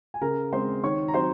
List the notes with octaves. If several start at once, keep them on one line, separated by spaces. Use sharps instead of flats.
G#5
C#3 A#4 A#5
G#3 C4 C5 C6
D#3 C#5 C#6
A#5
F#3 C4 C5 C6